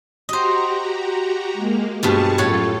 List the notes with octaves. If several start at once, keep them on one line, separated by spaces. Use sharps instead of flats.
F#4 G4 C5 D#5 A#5
G#3 A#3
G2 B2 F3 G#4 A5 C#6
F#2 A2 F4 A4 C#5